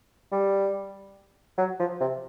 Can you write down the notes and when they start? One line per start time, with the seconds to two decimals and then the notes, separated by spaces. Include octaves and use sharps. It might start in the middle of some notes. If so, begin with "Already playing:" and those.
0.32 G3
1.58 F#3
1.79 F3
2.00 C3